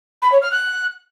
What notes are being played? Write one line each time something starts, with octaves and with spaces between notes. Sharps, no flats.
B5
C#5
F6
F#6